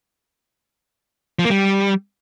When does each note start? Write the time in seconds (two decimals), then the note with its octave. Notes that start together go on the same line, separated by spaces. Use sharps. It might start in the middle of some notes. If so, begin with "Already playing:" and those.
1.39 F3
1.45 A#3
1.50 G3